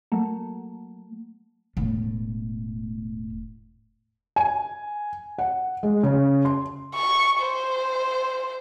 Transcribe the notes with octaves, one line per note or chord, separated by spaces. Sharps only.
F#3 A3 A#3
E1 A2
G#5
F#5
G#3
C#3
C6
C#6
C5